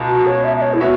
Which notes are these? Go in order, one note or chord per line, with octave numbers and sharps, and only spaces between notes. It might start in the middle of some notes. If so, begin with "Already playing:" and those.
Already playing: C#2 B2
F#4
C#5
E5
E5
C#5
E4
B3 F#4 C#5 E5